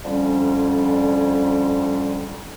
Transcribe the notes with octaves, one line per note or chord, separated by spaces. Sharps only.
F2 D3 G3 C#4